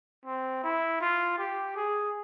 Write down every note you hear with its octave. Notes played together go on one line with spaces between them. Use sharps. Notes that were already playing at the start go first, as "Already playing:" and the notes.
C4
E4
F4
G4
G#4